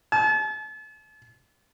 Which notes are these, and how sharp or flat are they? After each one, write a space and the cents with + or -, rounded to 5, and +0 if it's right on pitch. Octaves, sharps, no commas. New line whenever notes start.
A5 -40